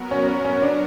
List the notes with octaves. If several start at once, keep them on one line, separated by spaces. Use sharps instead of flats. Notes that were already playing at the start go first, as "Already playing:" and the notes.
Already playing: F#3 B3 F#4 A#4
C#4
C#4
C#4
D4